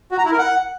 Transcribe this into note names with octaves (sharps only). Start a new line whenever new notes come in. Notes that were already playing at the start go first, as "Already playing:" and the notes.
F#4
A#5
E4
A#4
F#5